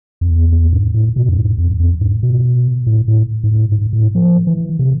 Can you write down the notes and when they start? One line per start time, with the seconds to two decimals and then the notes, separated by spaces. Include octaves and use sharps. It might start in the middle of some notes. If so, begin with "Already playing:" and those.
0.21 F2
0.30 E2
0.52 E2
0.73 G#2
0.94 A2
1.16 B2
1.29 F2
1.37 G#2
1.58 F2
1.80 F2
2.01 G#2
2.23 B2
2.87 A2
3.08 A2
3.44 G#2
3.51 A2
3.72 G#2
3.93 A2
4.15 F3
4.47 E3
4.79 C3